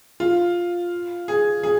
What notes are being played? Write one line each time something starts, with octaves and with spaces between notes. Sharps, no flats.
F4
G#4
G#4